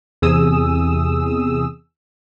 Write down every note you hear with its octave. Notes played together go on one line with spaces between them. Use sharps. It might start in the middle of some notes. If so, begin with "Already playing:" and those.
E2 C3 G#4 D#6 E6